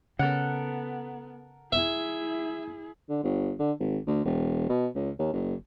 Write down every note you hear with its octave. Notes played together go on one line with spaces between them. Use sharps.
C#3 B3 A4 A#4 F#5
E4 G#4 E5
D3
G1
D3
G#1
D2
E1
B2
C#2
D#2
F#1